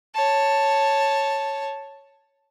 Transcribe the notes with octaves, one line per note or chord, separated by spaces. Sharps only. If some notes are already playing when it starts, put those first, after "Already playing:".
C#5 A5